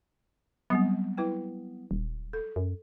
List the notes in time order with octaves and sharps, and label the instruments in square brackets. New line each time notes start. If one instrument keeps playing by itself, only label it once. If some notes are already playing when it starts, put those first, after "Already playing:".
[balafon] F#3 G3 C4 [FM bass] B3
[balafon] E4 B4 G5
[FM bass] D#1
[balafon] A4
[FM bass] F#2